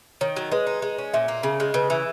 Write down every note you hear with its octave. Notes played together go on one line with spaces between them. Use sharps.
D#3 C#5
F#3
G#3 B4
D#4
G#3
C#4
A#2 E5
A#3
C#3
G#3
C#3 B4
E3